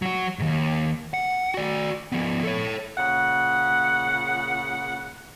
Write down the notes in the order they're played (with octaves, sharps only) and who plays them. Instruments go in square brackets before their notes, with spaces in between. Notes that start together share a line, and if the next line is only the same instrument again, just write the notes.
[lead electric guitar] F#3 F#4
D#2 G#2
F#5
F#4 D5
F3 B3
A4 C#5
[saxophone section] A#2 C#3 F#5